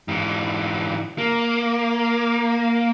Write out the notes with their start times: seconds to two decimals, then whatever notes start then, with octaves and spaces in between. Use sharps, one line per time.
0.08 G#2 E3
1.18 A#3